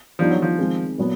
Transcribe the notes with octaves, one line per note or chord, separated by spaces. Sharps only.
D3 F3 G3 B3 D#4
F#3
F3
D#3 G#3 C4
A#2 F#3 B3